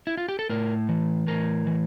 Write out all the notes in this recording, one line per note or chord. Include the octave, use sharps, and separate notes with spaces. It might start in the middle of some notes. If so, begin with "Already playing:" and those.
E4
F4
G4
A4
A2 A#4
E3
A2 A#4
E3